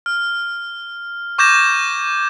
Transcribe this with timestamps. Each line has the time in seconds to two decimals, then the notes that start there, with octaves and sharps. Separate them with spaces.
0.06 F6
1.38 C#6 D6 G6 G#6 A#6 E7